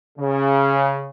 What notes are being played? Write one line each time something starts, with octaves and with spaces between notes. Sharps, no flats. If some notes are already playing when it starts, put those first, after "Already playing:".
C#3